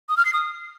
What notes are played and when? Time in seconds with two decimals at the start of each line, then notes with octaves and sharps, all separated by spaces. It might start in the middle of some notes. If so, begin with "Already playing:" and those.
0.09 D#6
0.17 F6
0.25 C7
0.33 D#6